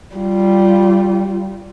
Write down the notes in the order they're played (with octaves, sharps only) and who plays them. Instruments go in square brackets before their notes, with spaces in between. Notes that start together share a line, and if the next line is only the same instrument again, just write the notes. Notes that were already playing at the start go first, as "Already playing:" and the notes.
[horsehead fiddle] G3 F4